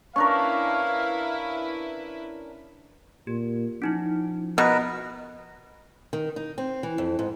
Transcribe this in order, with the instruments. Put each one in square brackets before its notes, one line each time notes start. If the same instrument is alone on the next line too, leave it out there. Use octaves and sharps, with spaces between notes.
[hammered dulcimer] C#4 D4 A#4 [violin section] E4 B4 [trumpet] F5 [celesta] C#6
[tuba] A#2 [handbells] G4
[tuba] F3 [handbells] C#4 D#4 E4
[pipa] B2 [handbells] B3 F#4 D#6 [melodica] A#4 B4
[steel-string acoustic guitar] D#3
D#4
C4
E3
F2
G#2